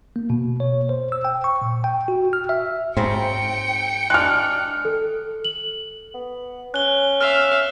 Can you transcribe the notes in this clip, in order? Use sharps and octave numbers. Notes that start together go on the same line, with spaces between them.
A#3
B2
C#5
C5
E6
G5
C#6
A#2
G5
F#4
F6
E5
G#2 C#3 F#3 C4 G5 C#7
G#3 D4 F6 F#6
A4
F#7
B3
C#4 F#6 G7
E5 F5 F6